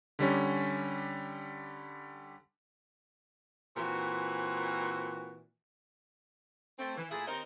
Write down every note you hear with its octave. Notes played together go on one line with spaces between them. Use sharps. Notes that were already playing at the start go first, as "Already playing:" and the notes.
D3 G3 C#4
A#2 E3 C4 F#4
A3 C4
E3
A#2 A3 E4 G#4
D#2 C4 D#4 A#4 C5 D#5